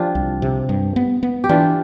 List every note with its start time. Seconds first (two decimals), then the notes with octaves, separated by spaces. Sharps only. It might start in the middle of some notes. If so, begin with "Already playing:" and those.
Already playing: F3 D4 F4 G4
0.15 C2
0.42 C3
0.69 G2
0.96 B3
1.23 B3
1.44 G4
1.49 E3 D4 F4